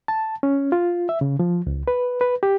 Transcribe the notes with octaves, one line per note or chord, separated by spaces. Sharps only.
A5
C#4
F4
E5
C#3
F3
C#2
B4
B4
G4